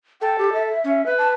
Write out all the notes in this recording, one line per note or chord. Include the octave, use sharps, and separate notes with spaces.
A4 G5
G4
E5
C#4
B4
A5